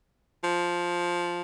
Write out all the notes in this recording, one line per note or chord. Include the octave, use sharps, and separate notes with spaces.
F3